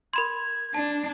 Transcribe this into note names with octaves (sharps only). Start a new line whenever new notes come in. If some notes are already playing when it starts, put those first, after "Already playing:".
A#4 B5 C6 G#6
D4 A5